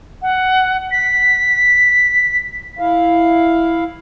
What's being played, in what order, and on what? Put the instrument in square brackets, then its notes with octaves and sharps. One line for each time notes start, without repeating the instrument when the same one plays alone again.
[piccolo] F#5
B6
[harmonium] E4 F5